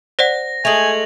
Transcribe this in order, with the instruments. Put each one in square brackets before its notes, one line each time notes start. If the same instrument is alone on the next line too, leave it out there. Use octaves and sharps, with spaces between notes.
[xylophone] C5 D5 F#5 [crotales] A#6
[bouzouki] G#3 A3 [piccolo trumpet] G#5 [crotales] F7 F#7